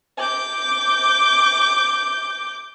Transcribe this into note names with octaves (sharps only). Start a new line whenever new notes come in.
D6 G6